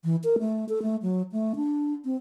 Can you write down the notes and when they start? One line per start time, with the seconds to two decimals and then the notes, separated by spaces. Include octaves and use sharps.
0.04 E3
0.24 A#4
0.39 A3
0.69 A4
0.82 A3
1.02 F#3
1.32 A3
1.56 D4
2.05 C4